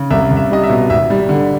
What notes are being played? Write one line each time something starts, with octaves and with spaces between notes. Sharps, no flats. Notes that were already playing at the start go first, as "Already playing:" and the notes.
Already playing: C#3
C2 E5
C2
E5
G3 D#5
E5
B2
G#1 E5
G3
D3